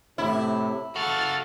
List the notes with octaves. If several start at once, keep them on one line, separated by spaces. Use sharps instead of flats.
A2 C3 E4
C#3 F#4 A4 F6 A6